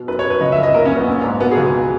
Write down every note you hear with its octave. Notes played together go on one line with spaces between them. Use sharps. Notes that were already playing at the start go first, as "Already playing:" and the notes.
Already playing: B2
F#2 B4
C#5
F#2
B4
C#2 D#5
E5
C#2
D#5
A#1 A#4
C#4
A#1
B3
A#1
G#2
B2 B3
G#4
C#2